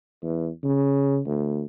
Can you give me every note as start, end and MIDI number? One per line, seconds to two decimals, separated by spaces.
0.22 0.48 40
0.64 1.20 49
1.26 1.63 38